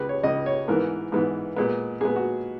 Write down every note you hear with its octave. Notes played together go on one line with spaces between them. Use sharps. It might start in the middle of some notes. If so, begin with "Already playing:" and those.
Already playing: C#2 C#3 G#3 B4
C#5
C#2 C#3 G#3 D#5
C#5
G#2 E3 B3 A#4
G#2 E3 B3
A#2 G#3 B3
A#2 G#3 B3 G#4
F#4